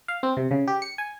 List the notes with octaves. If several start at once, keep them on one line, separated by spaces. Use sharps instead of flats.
F5
C4
C3
C#3
G4
C#7
G#5